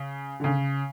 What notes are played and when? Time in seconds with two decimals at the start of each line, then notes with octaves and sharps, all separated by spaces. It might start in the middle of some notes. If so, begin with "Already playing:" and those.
Already playing: C#3
0.40 D3
0.44 C#3